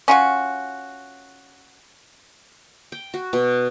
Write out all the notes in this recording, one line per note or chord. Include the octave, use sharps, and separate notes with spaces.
C#4 F4 F#4
G5
F#4
B2